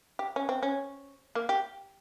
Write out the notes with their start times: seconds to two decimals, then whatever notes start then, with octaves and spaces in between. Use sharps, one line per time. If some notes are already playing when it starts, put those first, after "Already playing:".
0.19 G4
0.36 C#4
0.49 C4
0.63 C#4
1.35 A#3
1.49 G4